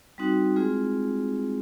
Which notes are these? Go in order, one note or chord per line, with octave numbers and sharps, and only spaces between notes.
G3 C4 D#4 F#4
G#3 C4 F4 G#4